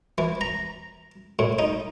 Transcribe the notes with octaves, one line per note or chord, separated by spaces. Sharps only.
E3
A#5
A2
D#4